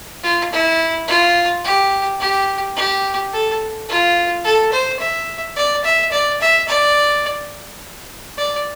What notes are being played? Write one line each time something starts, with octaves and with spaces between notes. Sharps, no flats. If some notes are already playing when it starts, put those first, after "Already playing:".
F4
E4
F4
G4
G4
G4
A4
F4
A4
C5
E5
D5
E5
D5
E5
D5
D5